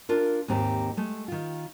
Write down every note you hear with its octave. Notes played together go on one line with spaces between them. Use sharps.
D4 F4 A#4
D#2 G#2 C4 D#4 G4 A#5
G#3 A3
D#3 F4